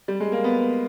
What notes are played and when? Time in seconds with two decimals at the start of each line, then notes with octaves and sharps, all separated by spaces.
0.08 G3
0.20 G#3
0.32 A#3
0.44 B3